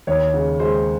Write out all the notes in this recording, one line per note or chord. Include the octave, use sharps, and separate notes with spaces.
D#2 C#5
C#3
G#3 C5